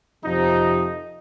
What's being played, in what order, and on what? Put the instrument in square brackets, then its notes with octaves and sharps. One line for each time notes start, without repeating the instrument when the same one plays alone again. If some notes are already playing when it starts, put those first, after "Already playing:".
[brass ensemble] F2 C3 F3 [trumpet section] D#4